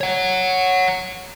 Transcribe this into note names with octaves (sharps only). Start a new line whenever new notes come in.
C#5 F#5